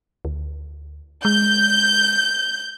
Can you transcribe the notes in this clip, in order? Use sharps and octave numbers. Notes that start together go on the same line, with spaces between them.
D2
G#3 G6